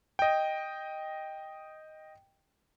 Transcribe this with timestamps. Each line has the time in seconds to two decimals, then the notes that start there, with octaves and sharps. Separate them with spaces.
0.19 D#5 G5